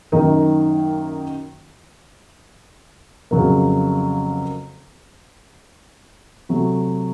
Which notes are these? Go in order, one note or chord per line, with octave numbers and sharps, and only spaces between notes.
F#2 D#3 A#3 D#4
F2 C#3 F#3 A#3
C3 F#3 A3